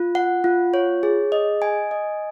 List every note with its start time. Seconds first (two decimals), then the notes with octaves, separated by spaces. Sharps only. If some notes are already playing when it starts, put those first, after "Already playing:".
Already playing: F4
0.15 F#5
0.44 F4
0.74 C#5
1.03 G#4
1.32 D#5
1.62 G#5
1.91 D#5